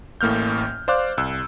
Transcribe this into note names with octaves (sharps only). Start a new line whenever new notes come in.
A1 A2 A#3 F6 G6
C5 D5 F5 D6 F#6
C2 E6